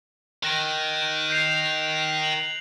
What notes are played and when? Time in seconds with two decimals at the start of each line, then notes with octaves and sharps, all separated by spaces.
0.43 D#3 F#6 A#6 D7
1.30 G6 C7 F7
2.23 F#7